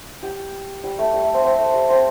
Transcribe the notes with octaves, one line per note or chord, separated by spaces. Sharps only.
G4
G3
A3
G3
A3
C4
C4
A3
G3
C4